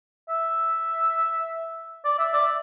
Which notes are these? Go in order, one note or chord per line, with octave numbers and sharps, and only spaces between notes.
E5
D5
E5
D5